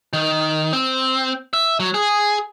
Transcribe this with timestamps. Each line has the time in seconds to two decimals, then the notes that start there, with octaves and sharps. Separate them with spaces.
0.13 D#3
0.73 C4
1.53 E5
1.80 F#3
1.94 G#4